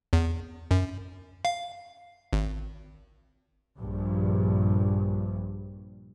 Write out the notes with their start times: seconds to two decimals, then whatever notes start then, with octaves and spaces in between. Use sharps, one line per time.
0.13 E2
0.71 F#2
1.45 F5
2.33 G#1
3.76 A#1 G2